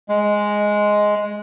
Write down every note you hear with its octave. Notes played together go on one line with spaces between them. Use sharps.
G#3